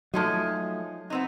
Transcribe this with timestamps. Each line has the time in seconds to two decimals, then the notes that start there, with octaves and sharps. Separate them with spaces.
0.14 F3 F#3 G#3 A3 D#4
1.10 B3 C4 D#4